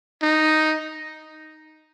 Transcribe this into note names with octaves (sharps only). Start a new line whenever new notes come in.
D#4